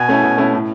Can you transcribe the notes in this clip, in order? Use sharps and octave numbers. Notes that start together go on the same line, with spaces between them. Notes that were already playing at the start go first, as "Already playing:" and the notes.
Already playing: B2 G#5
A3 C#4 E4
B2
A3 C#4 E4
A2